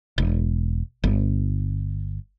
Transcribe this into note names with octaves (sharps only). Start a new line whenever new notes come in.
E1
G1